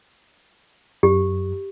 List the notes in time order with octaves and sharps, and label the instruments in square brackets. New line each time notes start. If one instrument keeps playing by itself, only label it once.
[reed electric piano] F#2 [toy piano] G4